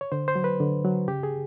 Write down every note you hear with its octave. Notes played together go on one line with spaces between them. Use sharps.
C#5
D3 C5
C5
F#3
B4
D3
F#3
C#3 G4
G#4